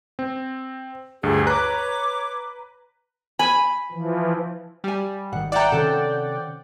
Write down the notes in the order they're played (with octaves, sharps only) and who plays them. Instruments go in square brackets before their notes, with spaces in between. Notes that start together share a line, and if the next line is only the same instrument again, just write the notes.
[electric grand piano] C4
[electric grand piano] D2 G2 [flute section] F4 G4 G#4
[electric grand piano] B4 A#5 F#6 [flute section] C#5 D6
[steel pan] G#5 [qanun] B5
[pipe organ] E3 F3
[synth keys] G3 [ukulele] G4 G#5
[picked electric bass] G#1 D#3 [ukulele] F#5
[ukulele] E4 A#5 [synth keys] D5 F#5 G5
[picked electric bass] C3 D#3 C#4 [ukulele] A4 C5